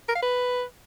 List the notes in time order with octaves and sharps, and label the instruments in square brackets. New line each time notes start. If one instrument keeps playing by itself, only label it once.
[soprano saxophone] A#4
F5
B4